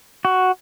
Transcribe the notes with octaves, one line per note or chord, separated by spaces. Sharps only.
F#4